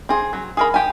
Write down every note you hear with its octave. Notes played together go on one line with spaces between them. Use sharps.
C4 G#4
F#3
G#4 A#4 B5
G4 G#5